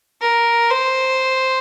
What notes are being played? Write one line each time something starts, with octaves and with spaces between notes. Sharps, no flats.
A#4
C5